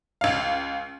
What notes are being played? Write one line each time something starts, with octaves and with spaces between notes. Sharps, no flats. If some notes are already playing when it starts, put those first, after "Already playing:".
C#2 F5